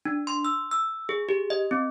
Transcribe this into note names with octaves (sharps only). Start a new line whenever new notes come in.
D4
C6
E6
E6
G#4
G4
D#5
C4